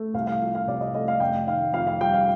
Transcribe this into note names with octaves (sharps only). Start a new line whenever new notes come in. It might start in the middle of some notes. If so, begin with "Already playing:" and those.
Already playing: A3
C2 F5
F5
F3
F5
C3 D5
D#5
A3 D#5
F5
F1 G5
D#3 F5
F2 F5
F5
G3 G5
F5